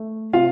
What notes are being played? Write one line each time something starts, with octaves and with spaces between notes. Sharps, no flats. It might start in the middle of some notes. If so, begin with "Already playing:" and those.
Already playing: A3
C3 F4 F5